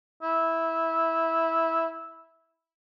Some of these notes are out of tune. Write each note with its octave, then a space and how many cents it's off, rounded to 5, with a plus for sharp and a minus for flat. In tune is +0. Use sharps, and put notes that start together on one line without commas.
E4 -10